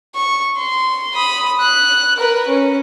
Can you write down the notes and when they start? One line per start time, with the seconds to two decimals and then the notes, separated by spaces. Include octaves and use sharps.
0.15 C#6
0.57 C6
1.15 B5 D#6
1.60 F#6
2.16 A#4 B4
2.47 C#4